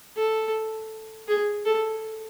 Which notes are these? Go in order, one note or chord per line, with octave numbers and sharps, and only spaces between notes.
A4
G#4
A4